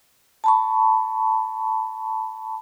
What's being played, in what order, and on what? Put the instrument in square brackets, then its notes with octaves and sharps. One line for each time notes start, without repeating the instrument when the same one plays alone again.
[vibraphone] A5 B5 C#6